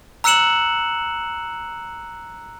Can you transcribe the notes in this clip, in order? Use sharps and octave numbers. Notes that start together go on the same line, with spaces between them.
A#5 E6 F#6 C#7 E7 F#7